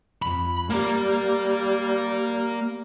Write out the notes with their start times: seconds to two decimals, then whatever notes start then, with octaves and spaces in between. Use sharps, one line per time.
0.22 F2 B5
0.70 G3 A#3